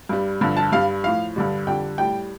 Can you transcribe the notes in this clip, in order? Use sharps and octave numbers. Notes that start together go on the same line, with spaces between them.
G2 G3
G2 D3 F3
A5
G2 G3 F5
A2 F3 F5
G2 D3 G3
F2 D3 G3 G5
A2 G3 G5